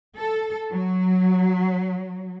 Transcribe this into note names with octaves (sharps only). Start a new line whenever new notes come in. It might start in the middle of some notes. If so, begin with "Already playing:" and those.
A4
F#3